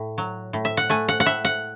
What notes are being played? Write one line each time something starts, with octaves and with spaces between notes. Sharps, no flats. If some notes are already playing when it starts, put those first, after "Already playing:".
Already playing: A2
F#3
A2
E5
F#5
A3 G#5
F#5
F#5
A2 E5
F#5